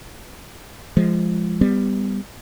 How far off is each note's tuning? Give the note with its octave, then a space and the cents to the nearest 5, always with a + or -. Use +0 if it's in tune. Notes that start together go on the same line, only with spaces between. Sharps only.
F3 -15 G#3 -10
G3 +15 B3 +25